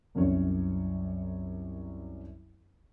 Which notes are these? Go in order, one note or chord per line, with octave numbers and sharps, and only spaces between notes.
C2 F#2 C#4 C#5